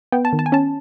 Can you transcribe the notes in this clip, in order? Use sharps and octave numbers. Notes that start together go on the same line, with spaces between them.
B3 G5
A5
D#3
A5
G#5
C#4 A5